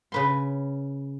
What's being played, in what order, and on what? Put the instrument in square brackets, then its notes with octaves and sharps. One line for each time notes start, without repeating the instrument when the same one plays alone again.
[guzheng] C#3 B4 C6